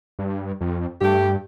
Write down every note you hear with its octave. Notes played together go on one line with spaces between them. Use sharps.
G2
F2
G2 A3 G4